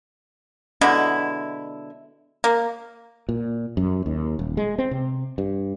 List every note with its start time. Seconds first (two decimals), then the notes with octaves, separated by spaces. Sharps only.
0.81 B2 D3 G#3 E4
2.44 A#3
3.29 A#2
3.77 F#2
4.06 D#2
4.39 D#1
4.57 G#3
4.78 C4
4.91 C3
5.38 G2